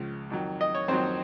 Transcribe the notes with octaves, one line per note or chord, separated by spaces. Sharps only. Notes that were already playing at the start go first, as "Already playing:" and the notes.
Already playing: C#2 C#3 F3
F2 D#3 F#3
D#5
C#5
F2 D#3 F#3 C4 C5